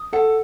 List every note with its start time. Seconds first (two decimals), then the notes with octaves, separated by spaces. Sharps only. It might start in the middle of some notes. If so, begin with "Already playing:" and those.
Already playing: D#6
0.13 A4 F#5